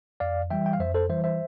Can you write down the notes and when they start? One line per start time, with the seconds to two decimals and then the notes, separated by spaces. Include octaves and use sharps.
0.20 F2 D5 F5
0.50 E3 G3 E5 G5
0.66 G5
0.73 F5
0.79 F2 C5 E5
0.94 A4 C5
1.09 E3 G3 C5 E5
1.24 C5 E5